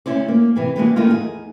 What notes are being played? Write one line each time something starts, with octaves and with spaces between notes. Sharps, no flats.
D2 C#4 E4 C5 D5
A#3
C3 E3 G#4
E3 G3 G#3 A#3 F#4 G#4
D#3 G3 A3 A#3 D#4 F4
E2 D#4 G#4